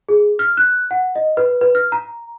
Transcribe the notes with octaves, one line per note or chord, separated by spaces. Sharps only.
G#4
F6
F#6
F#5
D#5
B4
B4
F6
A#5